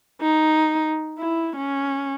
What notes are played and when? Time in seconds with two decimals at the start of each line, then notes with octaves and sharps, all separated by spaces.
0.21 D#4
1.18 E4
1.56 C#4